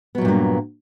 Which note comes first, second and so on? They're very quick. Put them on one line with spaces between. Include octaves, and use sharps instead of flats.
B3 F#3 A#2 G2 A#3